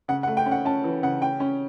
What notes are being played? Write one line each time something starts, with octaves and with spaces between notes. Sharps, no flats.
C#3 F#5
F#5
A3
G5
C#4
F#5
C#4 A5
E3
C#3 F#5
C#4 G5
C#4